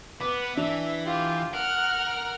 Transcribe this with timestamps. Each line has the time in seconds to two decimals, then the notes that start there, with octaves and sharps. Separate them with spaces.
0.21 B3 B4 D6
0.57 E3 D4 E5
1.05 F4 G4
1.53 A#4 F#5 F6